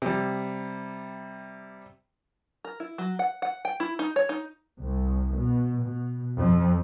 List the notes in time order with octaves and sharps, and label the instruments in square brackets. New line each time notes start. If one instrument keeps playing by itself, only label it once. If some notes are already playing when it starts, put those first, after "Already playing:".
[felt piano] C3 G3
[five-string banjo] A#4
E4
F#3
F#5
F#5
G5
E4
D#4
C#5
D#4
[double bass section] C2
B2
B2
F2